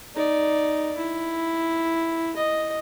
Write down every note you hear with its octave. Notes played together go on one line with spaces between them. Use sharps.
D#4 D5
E4
D#5